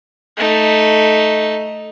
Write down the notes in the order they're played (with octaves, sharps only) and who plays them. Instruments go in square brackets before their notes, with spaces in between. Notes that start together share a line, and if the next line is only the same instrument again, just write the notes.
[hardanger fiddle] A3 D#4